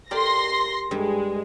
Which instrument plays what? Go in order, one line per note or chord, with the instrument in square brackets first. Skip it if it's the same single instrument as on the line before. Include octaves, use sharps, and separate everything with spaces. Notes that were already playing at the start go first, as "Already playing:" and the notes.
[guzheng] G4 A#4 D5 [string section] C6 A#6
[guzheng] G2 G3 [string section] G#3